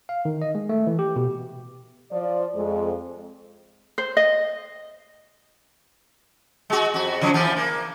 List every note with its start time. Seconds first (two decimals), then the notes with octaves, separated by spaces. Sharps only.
0.09 F5
0.25 D#3
0.42 D#5
0.55 G#3
0.69 A3
0.87 E3
0.99 G4
1.16 B2
2.12 F3 D5
2.55 F2 G#3
3.98 C5
4.17 D#5
6.70 G#3 F#4
6.94 F2 F#4
7.21 C#3 F3 F#3
7.34 E3 F3 B3
7.57 A#3